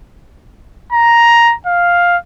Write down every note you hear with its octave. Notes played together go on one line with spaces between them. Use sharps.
A#5
F5